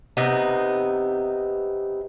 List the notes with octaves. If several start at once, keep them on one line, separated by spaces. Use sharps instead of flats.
C3 B3 D#4